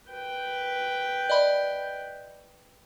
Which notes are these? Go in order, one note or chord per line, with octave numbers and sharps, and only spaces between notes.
B4 G5
D5 D#5 B5